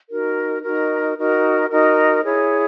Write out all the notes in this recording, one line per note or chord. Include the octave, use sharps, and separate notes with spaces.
D#4 F#4 A#4
D#4 F#4 A#4
D#4 F#4 A#4
D#4 F#4 A#4
E4 G#4 C#5